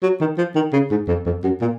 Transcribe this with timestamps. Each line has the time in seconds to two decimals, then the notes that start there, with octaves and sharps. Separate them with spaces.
0.03 F#3
0.21 D#3
0.38 F3
0.55 D#3
0.73 C#3
0.91 G#2
1.08 F2
1.26 F2
1.44 F#2
1.61 A#2